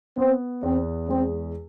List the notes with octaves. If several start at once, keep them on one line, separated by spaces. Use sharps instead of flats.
B3 C4
E2 C4
G#3 C4